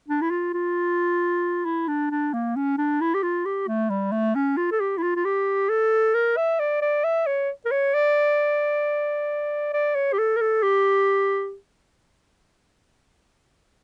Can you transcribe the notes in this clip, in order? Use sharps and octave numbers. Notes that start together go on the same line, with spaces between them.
D4
E4
F4
F4
E4
D4
D4
A#3
C#4
D4
E4
G4
F4
G4
A3
G3
A3
C#4
F4
A4
G4
E4
F4
F4
G4
A4
A#4
E5
D5
D5
E5
C#5
A#4
C#5
D5
D5
C#5
G4
A4
A#4
A4
G4